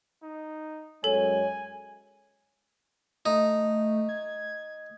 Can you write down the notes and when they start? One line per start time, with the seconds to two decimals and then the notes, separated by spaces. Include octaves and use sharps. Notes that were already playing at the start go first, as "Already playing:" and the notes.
0.23 D#4
1.04 F#2 G#3 A4 C#5 G#5
3.26 A3 D#4
4.09 G#6